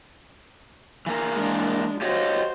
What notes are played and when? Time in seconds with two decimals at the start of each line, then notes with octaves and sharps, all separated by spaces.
1.06 E3 A#3 A#4
1.35 G#3 D4
2.02 F#4 G4 C5 C#5 D#5